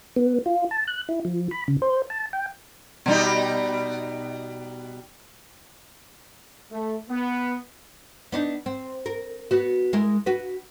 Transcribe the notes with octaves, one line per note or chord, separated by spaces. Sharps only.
B3
F4
A5
F#6
E4
F3
B5
C#3
C5
A5
G5
B2 G3 D#4
A3
B3
B3 D4 D#4
C4
A#4
B3 F#4
G#3 E4 A#4
F#4 B4